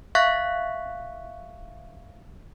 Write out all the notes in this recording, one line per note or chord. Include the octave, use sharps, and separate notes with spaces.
E5 F5 C#6 F#6 B6